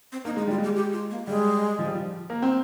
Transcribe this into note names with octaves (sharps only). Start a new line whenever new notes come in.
C4
A#3 D#4
G#3 D#4
G3 F4
G#3
G4
G4
F4
A#3
G3 G#3
F3
G3
F3
A#3
C4